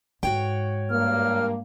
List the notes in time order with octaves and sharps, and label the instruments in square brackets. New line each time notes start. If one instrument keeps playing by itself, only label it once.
[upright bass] G#2 [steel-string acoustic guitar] F#4 C#5 G5
[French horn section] G2 A#3 [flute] F6